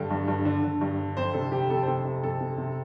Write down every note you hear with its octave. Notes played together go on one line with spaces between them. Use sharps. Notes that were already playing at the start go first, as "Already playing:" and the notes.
Already playing: G2 D3 A4
G2
G2
D3
D3
G2
D3
F2 C5
C3 A4
C3 G4
F2 A4
C5
C3 A4
C3
F2 A4
C3
C3